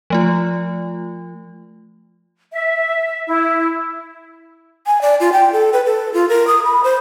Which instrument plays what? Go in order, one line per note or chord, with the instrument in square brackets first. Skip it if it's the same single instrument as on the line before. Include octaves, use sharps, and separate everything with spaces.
[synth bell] F3 A3 F4
[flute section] E5
E4
[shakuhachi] G#5
D5
F4
G5
A4
B4
A4
F4
A#4
D#6
B5
C5